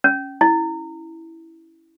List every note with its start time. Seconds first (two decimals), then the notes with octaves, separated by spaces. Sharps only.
0.04 C#4
0.41 E4